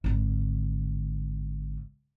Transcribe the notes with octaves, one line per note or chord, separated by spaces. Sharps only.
G#1 D3